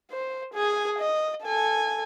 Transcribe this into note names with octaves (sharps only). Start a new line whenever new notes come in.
C5
G#4 G#5
D#5
A4 G#5